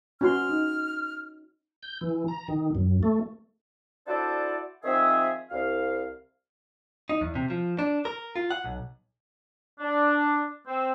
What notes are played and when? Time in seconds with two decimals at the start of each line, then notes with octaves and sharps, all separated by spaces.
0.21 C#4 F#4 C6 F6
0.49 D#4
1.83 G6
2.01 E3
2.28 A#5
2.48 D#3
2.75 F#2
3.03 A3
4.07 D4 E4 F#4 A4 C5 D5
4.84 D#3 F3 C4 G#4 E5
5.50 C2 F5
7.09 D#4
7.21 E2
7.35 C3
7.50 F3
7.79 D4
8.05 A#4
8.36 F4
8.51 F#5
8.64 B1
9.80 D4
10.67 C4